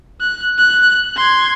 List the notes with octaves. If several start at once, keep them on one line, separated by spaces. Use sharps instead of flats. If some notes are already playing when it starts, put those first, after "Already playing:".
F#6
F#6
C6 G#6